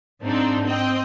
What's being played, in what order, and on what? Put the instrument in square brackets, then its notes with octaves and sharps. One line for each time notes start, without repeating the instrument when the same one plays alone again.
[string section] G#2 C4 D4 D#4
C4 D#5 G5